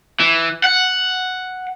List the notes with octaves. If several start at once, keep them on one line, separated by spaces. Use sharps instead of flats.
E3
F#5